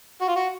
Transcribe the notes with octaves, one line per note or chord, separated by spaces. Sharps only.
F#4
F4
F#4